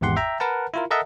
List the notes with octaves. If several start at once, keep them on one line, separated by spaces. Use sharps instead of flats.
G#1 E2 G#2 G4 F#5 C6
E5 G5 A#5
A#4 B4 F#5 A5
E4 F4 A#4
A4 A#4 D#5 E5 F#5 A5